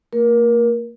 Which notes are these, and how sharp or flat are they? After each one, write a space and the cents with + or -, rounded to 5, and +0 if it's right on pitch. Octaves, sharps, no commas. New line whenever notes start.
A#3 -40 A#4 +25